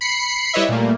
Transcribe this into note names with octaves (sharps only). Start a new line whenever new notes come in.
B5 C7 C#7
G3 E4 B4 C#5 D#5 E5
A#2 G3 A3 A#3